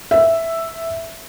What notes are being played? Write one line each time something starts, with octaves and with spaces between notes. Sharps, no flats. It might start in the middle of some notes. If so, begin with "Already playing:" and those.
E5